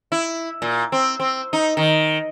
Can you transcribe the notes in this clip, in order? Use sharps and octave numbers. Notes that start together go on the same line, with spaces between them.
E4
A#2
C4
C4
D#4
D#3